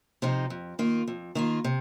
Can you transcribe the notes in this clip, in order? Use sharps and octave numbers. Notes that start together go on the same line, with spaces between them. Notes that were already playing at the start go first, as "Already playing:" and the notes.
C3 F3 D#4
F2
D#3 A#3 F4
F2
D#3 A#3 F4
C3